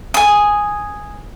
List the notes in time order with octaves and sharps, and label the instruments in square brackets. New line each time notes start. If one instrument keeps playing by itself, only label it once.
[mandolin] G#5 D#6